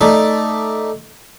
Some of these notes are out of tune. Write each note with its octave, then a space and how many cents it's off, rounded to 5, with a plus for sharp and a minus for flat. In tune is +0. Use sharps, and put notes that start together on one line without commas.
A3 +0 D#4 +0 D5 +0